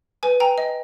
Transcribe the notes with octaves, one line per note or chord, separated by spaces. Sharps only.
B4 G#5
G5 G#5 A#5
D#5